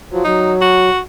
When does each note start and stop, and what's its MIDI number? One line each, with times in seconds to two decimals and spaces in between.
0.11 0.23 53
0.11 0.23 54
0.24 0.90 54
0.24 0.53 63
0.61 0.99 66